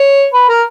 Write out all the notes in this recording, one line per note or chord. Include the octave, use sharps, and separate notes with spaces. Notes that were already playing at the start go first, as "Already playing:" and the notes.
Already playing: C#5
B4
A#4